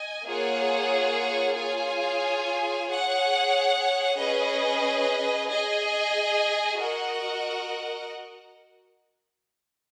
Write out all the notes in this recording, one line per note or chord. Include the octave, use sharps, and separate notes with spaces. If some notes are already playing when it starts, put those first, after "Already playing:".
Already playing: D#5 G#5
A#3 F4 G#4 C#5 F#5
F4 G#4 C#5 G#5
G#4 C#5 F#5
C#4 G#4 B4 D#5
G#4 D#5 G#5
F#4 A#4 D#5 F#5